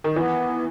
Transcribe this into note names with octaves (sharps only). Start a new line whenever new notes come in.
D#3
E3 B3